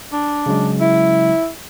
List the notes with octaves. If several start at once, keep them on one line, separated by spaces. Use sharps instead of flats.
D4
C#3 F#3 G#3
E4